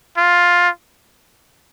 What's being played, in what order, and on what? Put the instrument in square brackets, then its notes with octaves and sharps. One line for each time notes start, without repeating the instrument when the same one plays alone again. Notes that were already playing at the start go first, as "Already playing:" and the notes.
[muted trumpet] F4